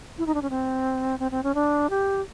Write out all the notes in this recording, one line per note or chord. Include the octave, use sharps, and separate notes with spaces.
E4
D#4
D4
C#4
C4
C4
C4
C#4
D4
G4